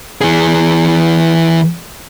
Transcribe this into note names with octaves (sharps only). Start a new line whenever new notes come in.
E3 G#4